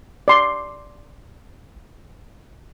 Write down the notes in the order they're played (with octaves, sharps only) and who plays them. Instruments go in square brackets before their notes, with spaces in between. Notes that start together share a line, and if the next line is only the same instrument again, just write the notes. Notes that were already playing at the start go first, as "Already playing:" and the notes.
[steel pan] D5 C6